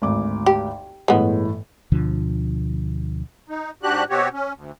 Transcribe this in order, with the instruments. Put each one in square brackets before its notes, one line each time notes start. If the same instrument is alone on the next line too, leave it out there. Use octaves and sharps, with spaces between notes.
[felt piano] G#1 D2 D6
[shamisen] G4
[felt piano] G1 A2 E3 [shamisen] G#3 B3
[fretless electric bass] D2 B2 D3 F3
[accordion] D#4
G#2 D4 F#4 G4 F#6
B2 C4 F#4 G4 C#5
C#4
D2